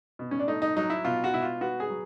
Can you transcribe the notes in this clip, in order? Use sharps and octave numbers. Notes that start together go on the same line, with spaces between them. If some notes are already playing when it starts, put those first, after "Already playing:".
B2
C#4
D4
A3 D#4
D#4
F#3 D#4
E4
B2 F4
F#4
B2 E4
F4
B3 F#4
G#4
F#3